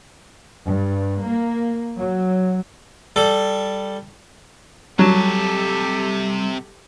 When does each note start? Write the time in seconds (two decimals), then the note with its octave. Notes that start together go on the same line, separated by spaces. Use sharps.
0.66 G2
1.24 A#3
1.98 F#3
3.16 G3 A4
4.99 C3 F#3 G3 G4 A4 A5